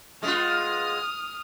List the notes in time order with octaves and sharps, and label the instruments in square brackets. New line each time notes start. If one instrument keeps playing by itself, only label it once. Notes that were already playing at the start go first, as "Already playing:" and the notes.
[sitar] G#3 B3 F4 [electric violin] D#6 F6